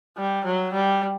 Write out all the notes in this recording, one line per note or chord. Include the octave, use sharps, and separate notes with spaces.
G3
F#3
G3